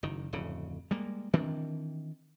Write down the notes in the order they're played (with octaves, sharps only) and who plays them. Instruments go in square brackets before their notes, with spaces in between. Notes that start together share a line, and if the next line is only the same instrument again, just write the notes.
[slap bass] F#1 D#3
D1 F2 C#3
G3 G#3 A#3
D#3 E3 C4 D4